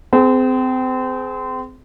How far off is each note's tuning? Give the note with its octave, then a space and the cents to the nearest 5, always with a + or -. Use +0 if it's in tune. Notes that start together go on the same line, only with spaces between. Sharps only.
C4 -30 G#4 +20